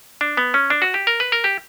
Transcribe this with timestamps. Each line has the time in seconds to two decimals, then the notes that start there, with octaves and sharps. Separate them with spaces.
0.21 D4
0.37 B3
0.54 C#4
0.70 D4
0.82 F#4
0.94 G4
1.07 A#4
1.20 B4
1.32 A#4
1.44 G4